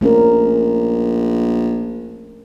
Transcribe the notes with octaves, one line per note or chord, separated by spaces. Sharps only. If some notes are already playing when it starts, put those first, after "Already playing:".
A#1 A3 C#4 A#4